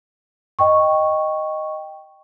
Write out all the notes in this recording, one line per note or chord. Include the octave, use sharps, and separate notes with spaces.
D#5 G5 C#6